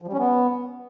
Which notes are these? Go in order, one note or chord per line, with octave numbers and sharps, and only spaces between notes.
F3
G3
C#4
B3